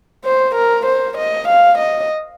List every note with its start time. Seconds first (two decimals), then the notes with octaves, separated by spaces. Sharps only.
0.24 C5
0.55 A#4
0.86 C5
1.17 D#5
1.48 F5
1.78 D#5